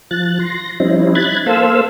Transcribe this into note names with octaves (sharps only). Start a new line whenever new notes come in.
F3 F#6 A6
C6 A#6
F3 G3 C4 C#4 D#4 E4
B5 F#6 G#6 A6
A#3 A4 C5 F5 E6